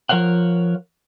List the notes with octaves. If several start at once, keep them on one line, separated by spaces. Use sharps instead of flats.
F3 A#4 C#5 F5 F#5